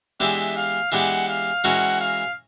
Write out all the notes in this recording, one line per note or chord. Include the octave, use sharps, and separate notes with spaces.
E3 G#3 B3 D4 G4 E5
F5
E3 G#3 B3 D4 G4 F#5
F5
E3 G#3 C#4 F#4 A#4 F#5
F5